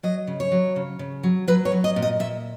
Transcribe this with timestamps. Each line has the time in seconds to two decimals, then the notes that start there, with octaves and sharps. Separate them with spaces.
0.03 F#3 D#5
0.27 C#3
0.40 C#5
0.52 F#3
0.76 C#3
0.99 C#3
1.23 F#3
1.48 F#3 B4
1.65 C#5
1.72 F#3
1.84 D#5
1.96 A#2
2.02 D#5
2.19 A#2 E5